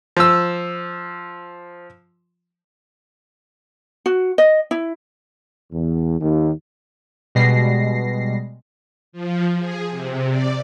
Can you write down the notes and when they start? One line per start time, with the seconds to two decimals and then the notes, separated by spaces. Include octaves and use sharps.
0.17 F3 E6
4.06 F#4
4.38 D#5
4.71 E4
5.72 E2
6.20 D#2
7.35 B2 G3 G#3 A#6 C7
9.12 F3
9.59 G#4
9.89 C3
10.30 D5